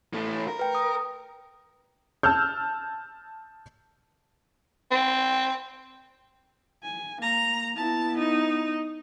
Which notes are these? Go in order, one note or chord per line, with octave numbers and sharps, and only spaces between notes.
E3 A3
A#4
B4 G5
D#6
A5 E6 F6 G6
C4
G#5
A#3 A#5
B3 E4 A5
D#4